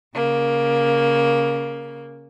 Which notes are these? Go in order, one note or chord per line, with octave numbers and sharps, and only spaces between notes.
C#3 A#3